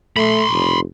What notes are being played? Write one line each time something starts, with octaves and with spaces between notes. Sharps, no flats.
A3 B5 C6
F1